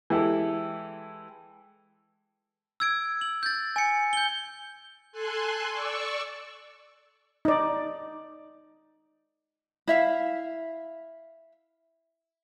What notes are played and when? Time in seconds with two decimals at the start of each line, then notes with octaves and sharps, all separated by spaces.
0.10 E3 G#3 E4 G4 A4
2.80 E6 G#6 D7
3.21 F#7
3.43 G6 A6
3.76 G#5 C#7
4.13 G6 G7
5.12 A4 G#5 C6 F#6
5.71 D5 C#6 E6
7.45 D#4 D5
9.87 E4 E5 F5